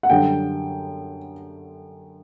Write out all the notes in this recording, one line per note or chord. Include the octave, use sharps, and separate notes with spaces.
F#5
F#2 D3 G3 G5